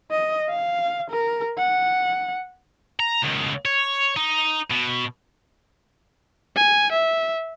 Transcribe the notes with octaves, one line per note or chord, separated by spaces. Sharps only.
D#5
F5
A#4
F#5
A#5
C#2 D#3
C#5
D#4
B2
G#5
E5